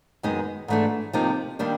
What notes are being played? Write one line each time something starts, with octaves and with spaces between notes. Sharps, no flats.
F#2 D#3 G#3 B3 D#4
G#2 E3 A3 D4
C3 F3 A#3 D#4
D#3 G3 A#3 D4